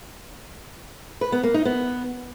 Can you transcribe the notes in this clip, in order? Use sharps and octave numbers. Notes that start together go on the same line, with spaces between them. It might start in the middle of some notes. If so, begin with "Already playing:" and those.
B4
B3
A#3
D#4
B3